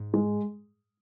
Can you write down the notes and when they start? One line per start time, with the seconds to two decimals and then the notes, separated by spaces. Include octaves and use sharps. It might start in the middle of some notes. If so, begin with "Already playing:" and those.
Already playing: G#2
0.14 G#3